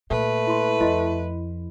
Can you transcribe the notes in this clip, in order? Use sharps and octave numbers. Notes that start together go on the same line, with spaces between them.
A#2 A3 B4
E4 C6
F2 E4 D#5 C6